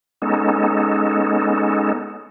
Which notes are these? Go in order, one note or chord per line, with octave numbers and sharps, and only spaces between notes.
G#3 B3 C#4 D#4 A4